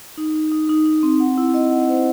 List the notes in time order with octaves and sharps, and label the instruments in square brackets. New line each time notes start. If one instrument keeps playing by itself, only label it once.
[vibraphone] D#4
D#4
D#4
D#4
D#4
C4
F#5
E4
D#5
F#5
C5